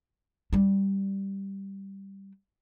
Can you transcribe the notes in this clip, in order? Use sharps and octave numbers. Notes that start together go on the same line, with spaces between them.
G3 D4